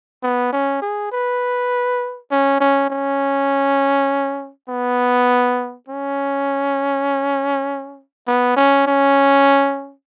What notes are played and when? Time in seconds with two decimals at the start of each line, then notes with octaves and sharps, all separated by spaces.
0.23 B3
0.53 C#4
0.82 G#4
1.12 B4
2.31 C#4
2.60 C#4
2.90 C#4
4.69 B3
5.88 C#4
8.27 B3
8.57 C#4
8.87 C#4